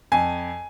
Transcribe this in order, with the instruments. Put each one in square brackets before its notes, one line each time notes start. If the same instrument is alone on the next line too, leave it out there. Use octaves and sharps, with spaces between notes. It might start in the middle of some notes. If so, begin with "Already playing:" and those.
[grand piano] F2 G#5